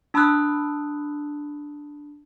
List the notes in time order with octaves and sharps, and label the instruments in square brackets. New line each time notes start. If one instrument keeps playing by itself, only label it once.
[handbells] D4 A5 B5 D#6 E6 F#6